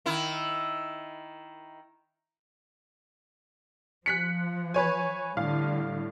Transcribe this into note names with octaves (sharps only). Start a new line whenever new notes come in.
D#3 E4
F3 F#6 B6 C#7
B4 C#5 G#5
A2 D3 G3 F5